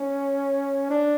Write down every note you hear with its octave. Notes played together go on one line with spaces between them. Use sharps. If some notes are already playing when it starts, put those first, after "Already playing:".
Already playing: C#4
D4